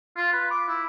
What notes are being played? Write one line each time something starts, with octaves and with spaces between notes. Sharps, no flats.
F4
B4
D6
E4